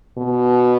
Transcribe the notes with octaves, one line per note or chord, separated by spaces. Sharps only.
B2